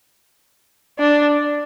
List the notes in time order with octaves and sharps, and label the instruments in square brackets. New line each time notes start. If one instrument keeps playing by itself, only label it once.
[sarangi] D4